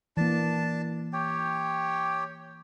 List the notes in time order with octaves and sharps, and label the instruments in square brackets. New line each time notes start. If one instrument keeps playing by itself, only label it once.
[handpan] E3 A#3 [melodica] D4 A5
[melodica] G4 C#5 G5